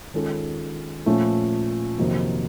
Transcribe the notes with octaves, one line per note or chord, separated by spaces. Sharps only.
D#3 G#3 C#4 F4 A4
A#2 F3 A3 C#4
F2 C3 D#3 F#3 A#3